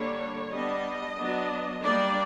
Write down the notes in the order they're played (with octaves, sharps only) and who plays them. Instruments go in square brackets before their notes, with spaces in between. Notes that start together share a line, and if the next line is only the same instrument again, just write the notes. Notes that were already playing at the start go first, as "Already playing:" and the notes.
Already playing: [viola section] D3 G3 A#3 D4 C#5
G3 B3 D4 D#5
F#3 B3 D4
G3 A#3 D4 D5